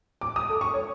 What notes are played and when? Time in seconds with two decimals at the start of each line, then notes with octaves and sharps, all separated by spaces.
0.21 D6
0.36 D#6
0.49 A4
0.61 C#6
0.74 C#5